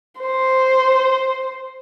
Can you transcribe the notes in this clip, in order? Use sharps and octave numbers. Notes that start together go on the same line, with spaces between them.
C5